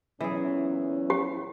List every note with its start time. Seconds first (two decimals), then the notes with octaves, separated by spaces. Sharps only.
0.21 E2 A#2 E3 F#3 C#4 G#4
1.10 G4